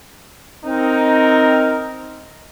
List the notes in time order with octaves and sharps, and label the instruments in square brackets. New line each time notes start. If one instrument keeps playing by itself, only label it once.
[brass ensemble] C4 D#4 A#4